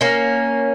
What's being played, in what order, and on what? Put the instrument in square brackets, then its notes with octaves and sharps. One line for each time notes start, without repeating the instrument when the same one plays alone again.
[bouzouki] A#3 C#4